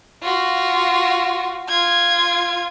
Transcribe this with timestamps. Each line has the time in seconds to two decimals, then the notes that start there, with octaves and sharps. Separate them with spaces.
0.23 F4 F#4
1.68 F4 G#6